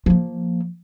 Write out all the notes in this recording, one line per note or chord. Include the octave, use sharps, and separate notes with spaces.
F3 A#3